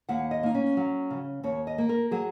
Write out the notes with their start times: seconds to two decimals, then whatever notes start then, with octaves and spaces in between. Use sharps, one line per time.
0.09 D#2 F#5
0.31 D#5
0.43 A#3 D#4
0.55 C#4
0.77 F#3
1.11 C#3
1.44 D#2 C#5
1.67 D#5
1.78 A#3
1.89 A#4
2.11 F#3 G#4